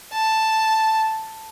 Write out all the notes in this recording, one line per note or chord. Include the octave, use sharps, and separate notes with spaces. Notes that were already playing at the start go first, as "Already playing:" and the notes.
A5